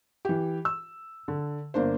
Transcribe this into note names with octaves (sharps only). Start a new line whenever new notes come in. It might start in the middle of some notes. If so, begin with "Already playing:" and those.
E3 G4
E6
D3
G1 A#3 D4 C5